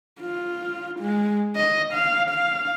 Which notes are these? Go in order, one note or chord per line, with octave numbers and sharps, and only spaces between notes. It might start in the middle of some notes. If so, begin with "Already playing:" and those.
F4
G#3
D#5
F5
F5